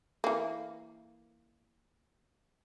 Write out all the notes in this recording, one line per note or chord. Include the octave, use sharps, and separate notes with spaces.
E3 A#3